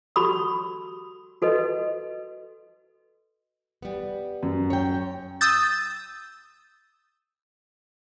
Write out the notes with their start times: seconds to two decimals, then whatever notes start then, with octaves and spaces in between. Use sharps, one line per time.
0.16 F#4 G4 A4 B5 C#6 D#6
1.42 F#4 A4 B4 D#5
3.82 G3 B3
4.43 F#2
4.70 C#5 G5
5.41 D#6 E6 G6 A6